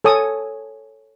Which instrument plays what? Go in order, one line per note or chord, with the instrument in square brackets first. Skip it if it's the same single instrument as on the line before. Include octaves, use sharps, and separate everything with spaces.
[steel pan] A4 C#5 G#5 D#6